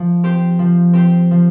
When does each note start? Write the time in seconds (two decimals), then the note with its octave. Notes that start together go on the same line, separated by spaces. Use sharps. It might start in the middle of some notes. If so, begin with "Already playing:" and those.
Already playing: F3
0.23 C4 G4 C5
0.59 F3
0.93 C4 G4 C5
1.31 F3